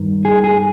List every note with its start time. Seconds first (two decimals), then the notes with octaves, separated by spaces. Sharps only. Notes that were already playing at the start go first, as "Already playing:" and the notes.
Already playing: G2 D#3
0.25 G#4
0.44 G#4